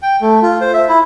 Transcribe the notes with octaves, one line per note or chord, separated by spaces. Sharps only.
G5
A3
F4
C5
E5
E4